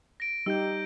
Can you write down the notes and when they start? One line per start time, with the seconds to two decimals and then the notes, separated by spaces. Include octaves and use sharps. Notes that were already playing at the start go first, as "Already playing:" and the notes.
0.20 A#6 D7
0.46 G3 D#4 G4 E6 G6